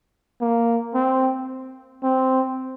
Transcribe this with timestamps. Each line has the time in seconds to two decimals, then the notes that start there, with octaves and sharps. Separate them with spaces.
0.41 A#3
0.94 C4
2.03 C4